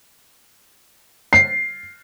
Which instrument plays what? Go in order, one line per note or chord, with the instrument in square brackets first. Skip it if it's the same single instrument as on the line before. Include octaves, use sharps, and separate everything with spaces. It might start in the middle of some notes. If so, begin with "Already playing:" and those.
[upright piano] C7